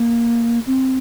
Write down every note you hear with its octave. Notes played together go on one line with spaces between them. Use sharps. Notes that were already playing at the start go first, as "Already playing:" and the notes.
Already playing: A#3
C4